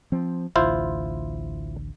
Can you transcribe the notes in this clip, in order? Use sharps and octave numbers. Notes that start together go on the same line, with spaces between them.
F3 C4
A1 D2 E4 F4 C5